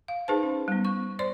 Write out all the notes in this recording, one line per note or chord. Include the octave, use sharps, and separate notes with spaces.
F5
D#4 G#4 B4 C5 A5
C#4
G3 B3
C#6
C5 D5 C6